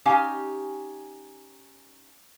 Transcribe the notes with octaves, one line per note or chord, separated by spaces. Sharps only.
C#4 D#4 G4 F5 G#5